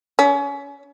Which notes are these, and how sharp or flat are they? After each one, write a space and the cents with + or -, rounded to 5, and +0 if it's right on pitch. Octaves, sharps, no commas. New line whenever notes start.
C#4 +30